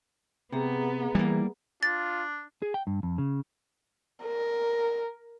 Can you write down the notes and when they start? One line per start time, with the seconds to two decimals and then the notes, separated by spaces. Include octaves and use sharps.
0.52 C3 B3 G#4 E5 A#5
1.15 E3 G3 A#3
1.83 D4 F4 A6
2.62 G#4
2.74 G5
2.87 G2
3.03 F2
3.18 C#3
4.24 A#4